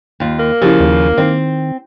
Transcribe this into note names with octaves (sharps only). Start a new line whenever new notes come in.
D#2 F4
A#3
C#3 F3 E4 G4
D#2
D#3 C4